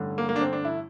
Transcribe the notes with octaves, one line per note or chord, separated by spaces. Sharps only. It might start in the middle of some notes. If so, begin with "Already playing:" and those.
Already playing: A1 G2 D3
A#3
A#3
D4
C4
D4
E4